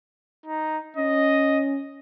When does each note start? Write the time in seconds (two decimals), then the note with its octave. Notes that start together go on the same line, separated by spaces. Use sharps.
0.46 D#4
0.97 C#4 D#5